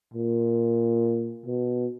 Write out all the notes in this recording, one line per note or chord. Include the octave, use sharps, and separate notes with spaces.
A#2
B2